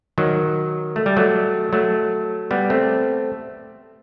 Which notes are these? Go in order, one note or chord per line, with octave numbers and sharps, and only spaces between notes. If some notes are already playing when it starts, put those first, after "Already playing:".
D#3 F#3
A3
G3
F#3 A3
F#3 A3
G3 B3
A3 C4